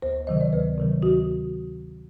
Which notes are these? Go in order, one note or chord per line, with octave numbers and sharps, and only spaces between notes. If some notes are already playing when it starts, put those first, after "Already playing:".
D2 C5
C3 D#3 F#3 D#5
D5
D2 B4
C3 D#3 F#3
D2 F#4